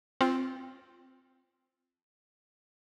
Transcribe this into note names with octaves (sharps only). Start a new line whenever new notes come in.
C4 F4